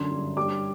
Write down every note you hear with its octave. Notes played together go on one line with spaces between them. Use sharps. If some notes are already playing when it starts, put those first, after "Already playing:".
Already playing: F#2 D3 C6
G2
G3 D6